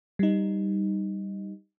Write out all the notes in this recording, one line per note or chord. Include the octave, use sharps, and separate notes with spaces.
G3 D#4